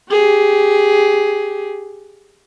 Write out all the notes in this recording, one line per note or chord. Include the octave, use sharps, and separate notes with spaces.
G4 G#4